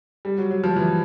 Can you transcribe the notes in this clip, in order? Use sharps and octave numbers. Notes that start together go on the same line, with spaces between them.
G3
F#3
F#3
F3
E3